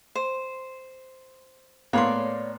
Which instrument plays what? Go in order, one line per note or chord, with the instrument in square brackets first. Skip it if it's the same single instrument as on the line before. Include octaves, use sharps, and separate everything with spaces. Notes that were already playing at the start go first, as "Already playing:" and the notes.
[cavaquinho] C5
[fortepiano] A2 A#3 B3 [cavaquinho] C#5 D5 C6